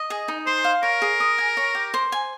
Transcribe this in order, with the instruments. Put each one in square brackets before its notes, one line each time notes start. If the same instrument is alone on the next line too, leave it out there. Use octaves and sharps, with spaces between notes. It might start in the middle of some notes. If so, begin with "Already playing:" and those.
Already playing: [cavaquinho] D#5
G#4
D#4
[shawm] C5 [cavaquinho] C6
[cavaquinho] F5
[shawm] A#4 [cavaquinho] C#5
[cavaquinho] G#4
D#6
G#5
C#5
G4
C5
G#5